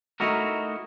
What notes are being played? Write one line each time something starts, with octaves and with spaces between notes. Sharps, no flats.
A3 D#4 E4 F#4 A#4